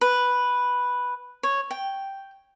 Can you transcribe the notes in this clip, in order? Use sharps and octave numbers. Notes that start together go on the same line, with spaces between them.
B4
C#5
G5